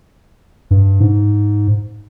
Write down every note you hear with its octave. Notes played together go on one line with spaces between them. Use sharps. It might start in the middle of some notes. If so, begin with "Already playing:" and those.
G2
G#2